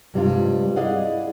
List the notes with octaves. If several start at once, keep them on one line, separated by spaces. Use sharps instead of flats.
G2 C3 G3 G#3 D4 F4
E4 G#4 D5 D#5 F5 F#5